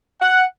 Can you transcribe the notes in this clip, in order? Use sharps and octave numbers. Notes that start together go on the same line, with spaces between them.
F#5